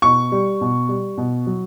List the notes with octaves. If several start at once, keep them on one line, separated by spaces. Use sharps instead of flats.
B2 C#6
G3
B2
G3
B2
F#3